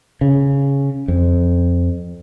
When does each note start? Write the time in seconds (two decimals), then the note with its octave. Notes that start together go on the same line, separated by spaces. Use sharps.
0.21 C#3
1.08 F2